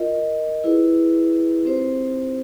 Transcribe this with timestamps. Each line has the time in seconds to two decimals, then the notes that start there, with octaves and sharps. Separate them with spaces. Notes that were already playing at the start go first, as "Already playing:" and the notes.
Already playing: F4 A#4 D#5
0.64 E4 G#4 B4
1.65 C4 D#4 G4 C5